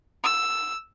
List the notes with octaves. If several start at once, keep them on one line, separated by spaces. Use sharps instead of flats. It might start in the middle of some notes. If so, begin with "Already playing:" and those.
E6